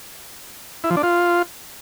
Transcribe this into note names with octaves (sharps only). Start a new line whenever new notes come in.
E4
F3
D4
F4